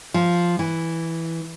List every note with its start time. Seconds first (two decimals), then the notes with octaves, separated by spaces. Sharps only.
0.14 F3
0.59 E3